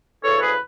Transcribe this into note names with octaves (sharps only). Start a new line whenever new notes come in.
D2 C#3 E3 A4 C#5
G#4 B4